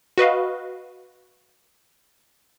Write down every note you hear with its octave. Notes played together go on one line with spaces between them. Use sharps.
F#4 B4 D#5 F5